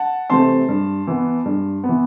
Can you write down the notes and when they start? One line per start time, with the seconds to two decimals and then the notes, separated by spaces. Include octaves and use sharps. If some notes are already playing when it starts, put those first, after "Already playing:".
Already playing: F#5 A5
0.30 C3 E3 A3 C4 A5 C6
0.69 G2
1.07 E3 B3
1.45 G2
1.84 B3
1.89 E3